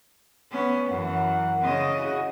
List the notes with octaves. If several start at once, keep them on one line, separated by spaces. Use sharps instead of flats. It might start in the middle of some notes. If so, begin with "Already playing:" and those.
B3 C#4
F#2 E3 A#4 F#5
C#3 D#5
E4 F#4 G#4